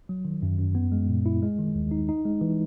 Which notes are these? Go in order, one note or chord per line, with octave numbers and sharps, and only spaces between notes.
F#3
D#3
F#2
F#2
B3
G#3
A#2
E4
G#3
D#3
D#2
D#4
D#4
G#3
E3